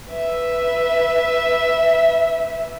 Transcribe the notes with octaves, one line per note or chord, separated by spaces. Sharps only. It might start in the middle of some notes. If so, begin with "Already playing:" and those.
B4 E5